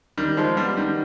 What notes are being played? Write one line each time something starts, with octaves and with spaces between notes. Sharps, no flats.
D#3 G3
F3 G#3
G3 B3
D#3 G3